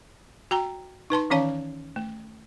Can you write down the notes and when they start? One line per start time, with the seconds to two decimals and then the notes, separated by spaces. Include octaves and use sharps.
0.51 F#4 G5 A#5
1.10 D#4 B4 A5 C6
1.30 D#3 E3 C#4 C#5 F5 A5
1.96 A3